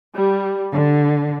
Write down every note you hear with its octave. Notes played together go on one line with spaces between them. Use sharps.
G3
D3